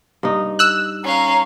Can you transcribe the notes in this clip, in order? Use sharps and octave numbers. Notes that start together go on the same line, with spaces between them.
G2 D#4
E6 F#6
C#4 F5 A#5